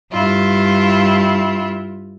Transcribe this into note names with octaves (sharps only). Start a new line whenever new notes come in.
G2 E4 F4